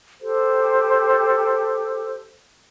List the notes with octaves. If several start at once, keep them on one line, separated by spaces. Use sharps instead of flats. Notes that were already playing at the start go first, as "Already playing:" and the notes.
G4 A4 C5